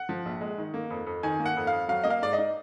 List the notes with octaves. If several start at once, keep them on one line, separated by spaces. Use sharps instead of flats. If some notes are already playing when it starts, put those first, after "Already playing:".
Already playing: F#5
F3
A#1
G#3
D#3
A#3
F2
F2
D#3 G#5
A#3
F#5
F2
F2 F5
F#3 F5
A#3 D#5
F5
G#2 D5
D#5
D#4